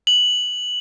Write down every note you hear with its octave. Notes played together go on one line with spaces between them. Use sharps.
F#7